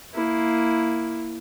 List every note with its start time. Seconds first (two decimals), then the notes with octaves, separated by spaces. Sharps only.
0.14 A#3 E4